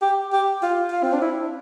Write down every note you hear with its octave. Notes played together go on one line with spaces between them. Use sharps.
G4
G4
F4
F4
C4
D4
E4